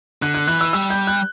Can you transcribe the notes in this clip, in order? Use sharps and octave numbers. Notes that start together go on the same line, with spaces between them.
D3 F#6
F#6
E3 F#6
E6
G3 E6
G6
F#6